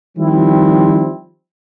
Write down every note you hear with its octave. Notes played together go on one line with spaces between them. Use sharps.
D#3 F3 G3 C4 E4